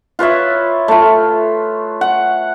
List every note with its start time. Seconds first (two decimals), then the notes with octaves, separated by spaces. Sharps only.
0.19 F4 B4 C#5 E5
0.88 A3 F4
2.01 F#5